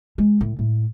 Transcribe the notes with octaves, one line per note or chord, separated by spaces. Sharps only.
G#3
A2
A2